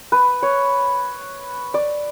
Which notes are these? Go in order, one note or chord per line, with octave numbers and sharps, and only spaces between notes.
B4
C#5
D5